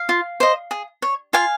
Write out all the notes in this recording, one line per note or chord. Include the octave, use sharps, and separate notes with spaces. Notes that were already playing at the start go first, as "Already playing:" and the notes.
Already playing: F5
F4
C5 D#5
G#4
C#5
F4 F5 G#5